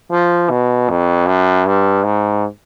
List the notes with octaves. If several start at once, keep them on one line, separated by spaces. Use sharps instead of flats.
F3
B2
F2
F#2
G2
G#2